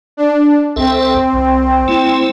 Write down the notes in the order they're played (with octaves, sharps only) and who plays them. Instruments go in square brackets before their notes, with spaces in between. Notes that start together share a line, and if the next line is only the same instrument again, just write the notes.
[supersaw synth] D4
[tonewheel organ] C#2 A4 E5 [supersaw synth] C4
[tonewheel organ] C2
A3 E4